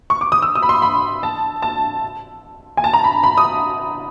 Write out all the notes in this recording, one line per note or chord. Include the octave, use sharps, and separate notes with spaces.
C#6
D6
D#6
E6
D#6
B5
C6
B5
A5
A5
G#5
A5
A#5
B5
B5
D#6